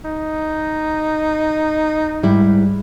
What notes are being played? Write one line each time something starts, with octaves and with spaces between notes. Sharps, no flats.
D#4
G#2 G3 E4